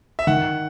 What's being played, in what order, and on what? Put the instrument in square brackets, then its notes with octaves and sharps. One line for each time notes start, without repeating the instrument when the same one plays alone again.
[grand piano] E5
[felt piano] D#3 [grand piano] F#5